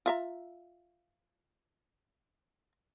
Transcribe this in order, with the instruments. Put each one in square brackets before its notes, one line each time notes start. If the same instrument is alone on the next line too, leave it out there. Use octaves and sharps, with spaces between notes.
[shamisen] F4 E5 A#5